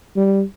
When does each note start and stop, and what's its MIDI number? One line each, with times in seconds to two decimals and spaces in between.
0.16 0.43 55